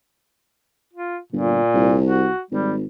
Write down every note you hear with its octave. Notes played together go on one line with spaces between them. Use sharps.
F4
G1 A#2
C2
F#4
G#1 G3